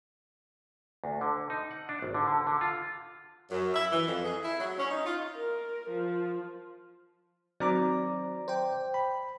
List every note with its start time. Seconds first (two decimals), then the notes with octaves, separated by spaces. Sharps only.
1.04 D2
1.21 D3
1.50 D#4
1.71 F#5
1.89 D4
2.02 G#1
2.14 D3
2.28 D3
2.47 D3
2.61 F4
3.51 F#2
3.74 E5
3.91 E3
4.08 F2
4.24 G#4
4.43 E4
4.60 F#3
4.77 C#4
4.89 D#4
5.05 F4
5.36 A#4
5.89 F3
7.60 D#3 F#3 C4 D5 A#5 D6
8.48 C5 G5
8.94 B5